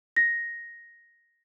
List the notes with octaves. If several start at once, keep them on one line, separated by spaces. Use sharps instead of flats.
A#6